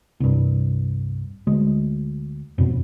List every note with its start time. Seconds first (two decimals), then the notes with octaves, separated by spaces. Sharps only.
0.20 C2 G2
1.47 D2 G#3
2.58 F2 B2